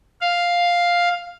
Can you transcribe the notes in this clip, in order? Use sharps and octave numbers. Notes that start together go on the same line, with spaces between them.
F5